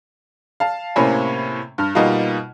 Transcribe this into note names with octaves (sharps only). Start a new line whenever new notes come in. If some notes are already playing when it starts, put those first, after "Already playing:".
F5 A5
A2 C3 A#3 C#4 G#5 B5
G2 F6
B2 G3 A#3 D#4 F4